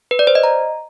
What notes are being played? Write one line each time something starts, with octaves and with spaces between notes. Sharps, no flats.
B4
D5
C5
D#5
A#5